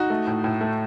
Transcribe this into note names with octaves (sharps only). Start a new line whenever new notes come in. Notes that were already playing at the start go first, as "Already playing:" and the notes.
Already playing: D#4 F#4
A3
A2
A2
A3